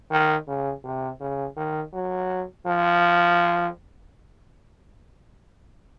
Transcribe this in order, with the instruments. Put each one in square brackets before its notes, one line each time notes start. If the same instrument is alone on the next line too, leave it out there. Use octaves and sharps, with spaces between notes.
[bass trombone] D#3
C#3
C3
C#3
D#3
F#3
F3